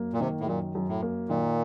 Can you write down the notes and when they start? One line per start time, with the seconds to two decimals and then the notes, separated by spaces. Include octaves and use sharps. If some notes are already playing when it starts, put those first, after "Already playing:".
Already playing: F#2 A#3
0.13 A#2
0.20 C3 D#3
0.40 A2
0.46 F#2 A#2
0.75 F#2
0.89 A2
1.03 A#3
1.29 A#2 D#3